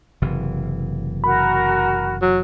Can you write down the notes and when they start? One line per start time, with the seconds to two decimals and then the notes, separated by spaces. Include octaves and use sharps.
0.22 F#1 C3 E3
1.24 F#4 A#4 B5
2.22 F#3